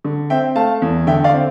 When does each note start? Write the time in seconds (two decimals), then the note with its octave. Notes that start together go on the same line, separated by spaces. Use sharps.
0.04 D3
0.30 C4 E5 G5
0.55 A3 F5 A5
0.82 E2
1.07 D3 E5 G5
1.24 D5 F5
1.33 C4